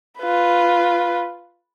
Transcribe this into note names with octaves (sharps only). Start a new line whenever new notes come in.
F4 B4